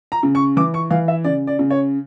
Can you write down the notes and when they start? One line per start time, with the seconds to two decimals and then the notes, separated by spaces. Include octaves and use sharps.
0.12 A#5
0.23 C#3
0.35 C#6
0.57 E3 D6
0.74 C#6
0.91 E3 F5
1.08 E5
1.24 C#3 D5
1.47 D5
1.59 C#3
1.70 C#5